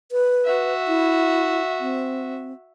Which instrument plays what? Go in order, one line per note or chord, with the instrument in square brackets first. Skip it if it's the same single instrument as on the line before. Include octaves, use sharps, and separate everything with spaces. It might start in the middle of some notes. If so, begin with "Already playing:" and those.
[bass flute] B4
[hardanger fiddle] F#4 E5
[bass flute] E4
C4